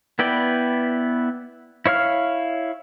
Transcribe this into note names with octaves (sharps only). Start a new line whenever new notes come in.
B3 E4 B4 D5 G5
E4 C#5 F5 F6